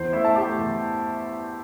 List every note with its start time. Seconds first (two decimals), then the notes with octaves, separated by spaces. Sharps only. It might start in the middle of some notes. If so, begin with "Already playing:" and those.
Already playing: E2 E3 C5
0.13 A3 E4 E5
0.24 A5
0.35 A3 G4 G5
0.59 E2